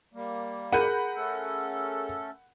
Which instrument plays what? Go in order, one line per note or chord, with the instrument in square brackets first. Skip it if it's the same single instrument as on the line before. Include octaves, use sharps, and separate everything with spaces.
[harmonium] G3 A#3
[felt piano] G#4 A#4 D#7 [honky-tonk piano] F#5 B5 G6
[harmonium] A3 C#4 A4